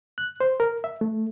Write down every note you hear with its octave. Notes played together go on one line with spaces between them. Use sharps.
F#6
C5
A#4
E5
A3